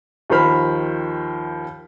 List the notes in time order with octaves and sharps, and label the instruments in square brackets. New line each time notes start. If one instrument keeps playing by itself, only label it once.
[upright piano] D#2 D#3 F3 C5 B5 F6